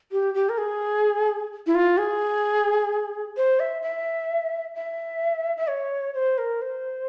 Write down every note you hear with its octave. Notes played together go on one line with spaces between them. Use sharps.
G4
G4
A#4
G#4
E4
F4
G#4
C5
E5
E5
E5
E5
C#5
C5
A#4
C5